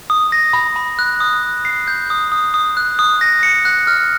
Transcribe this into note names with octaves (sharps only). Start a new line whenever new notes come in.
D#6
A#6
B5
B5
F#6
D#6
D#6
C7
G6
D#6
D#6
D#6
F#6
D#6
A#6
C#7
F#6
F6